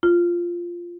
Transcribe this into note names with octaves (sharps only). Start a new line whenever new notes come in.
F4